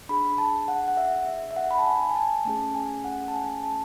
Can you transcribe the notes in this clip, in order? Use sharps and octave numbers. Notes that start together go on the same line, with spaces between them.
D4 G#4 B5
A5
F#5
F#5
E5
E5
E5
F#5
B5
A5
G#5
G#5
A5
A3 C#4 G#4 A5
G#5
F#5
A5
G#5
A5